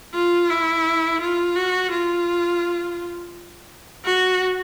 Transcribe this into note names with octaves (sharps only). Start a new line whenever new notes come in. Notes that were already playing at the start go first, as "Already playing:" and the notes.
F4
E4
F4
F#4
F4
F#4